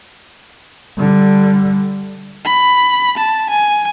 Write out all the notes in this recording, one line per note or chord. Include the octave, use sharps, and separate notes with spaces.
D3 G3
B5
A5
G#5